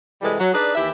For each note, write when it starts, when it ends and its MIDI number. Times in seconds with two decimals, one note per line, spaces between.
0.22 0.34 48
0.22 0.34 52
0.22 0.34 55
0.22 0.34 56
0.22 0.34 69
0.22 0.34 71
0.39 0.50 54
0.54 0.72 62
0.54 0.72 63
0.54 0.72 68
0.54 0.72 71
0.54 0.72 74
0.75 0.90 39
0.75 0.90 52
0.75 0.90 64
0.75 0.90 67
0.75 0.90 76